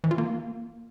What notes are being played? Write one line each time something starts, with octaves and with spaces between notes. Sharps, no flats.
E3
F4
A#3